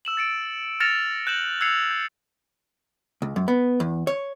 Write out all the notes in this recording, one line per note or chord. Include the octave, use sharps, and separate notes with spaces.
E6 E7 F#7
A6 C#7 D7
F6 A6 A#6 C#7 E7 F7
F#6 G6 E7 F#7
E6 F#6 G#6 C7 C#7 F7
G6
C#2
F#2
B3
E2
C#5